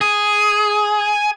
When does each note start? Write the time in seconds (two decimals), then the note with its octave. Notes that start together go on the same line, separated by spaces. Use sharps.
0.01 G#4